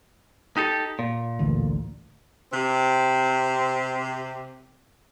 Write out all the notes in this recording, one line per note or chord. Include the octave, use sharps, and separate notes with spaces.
D#4 G4 A4
A#2
A1 D2
C3 C4 G4